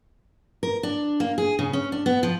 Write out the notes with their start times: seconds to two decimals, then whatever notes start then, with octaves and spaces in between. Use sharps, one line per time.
0.63 A#4
0.83 D4
1.20 A#3
1.38 G#4
1.59 C#3
1.73 C#4
1.92 D4
2.06 B3
2.23 F3